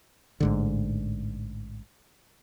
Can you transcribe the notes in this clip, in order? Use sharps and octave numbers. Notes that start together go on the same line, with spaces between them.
A1 G#2 D3